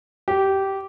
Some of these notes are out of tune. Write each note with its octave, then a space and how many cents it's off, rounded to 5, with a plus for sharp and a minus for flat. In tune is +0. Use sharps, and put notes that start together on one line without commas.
G4 -15